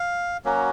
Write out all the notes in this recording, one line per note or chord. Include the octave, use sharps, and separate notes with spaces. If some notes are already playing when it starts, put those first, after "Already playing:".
Already playing: F5
F#3 A#3 C#4 F#4